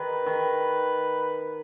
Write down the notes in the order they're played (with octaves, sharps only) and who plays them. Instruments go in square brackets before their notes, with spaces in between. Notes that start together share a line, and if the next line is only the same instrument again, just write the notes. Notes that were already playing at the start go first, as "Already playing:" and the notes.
Already playing: [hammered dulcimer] D#3 [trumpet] B4
[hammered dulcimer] D#3